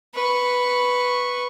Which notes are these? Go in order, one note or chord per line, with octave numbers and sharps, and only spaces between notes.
B4 C#6